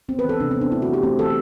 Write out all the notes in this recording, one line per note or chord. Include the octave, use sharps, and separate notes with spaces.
B3 C4
B4
E3 A4
C3 D4
C4
B3 D4
A3 E4
F#4
E3
G4
A3 C4
E3 A4